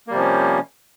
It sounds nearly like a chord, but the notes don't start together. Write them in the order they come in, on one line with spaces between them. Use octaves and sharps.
A#3 G3 C3 F3 C#4